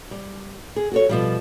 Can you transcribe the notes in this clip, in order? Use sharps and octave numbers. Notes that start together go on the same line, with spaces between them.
G3
G#4
F#4 A4 C#5
B2 F3 G3